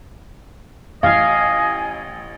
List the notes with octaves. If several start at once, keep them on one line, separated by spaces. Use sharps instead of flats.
A1 D#5 F5 G#5 G#6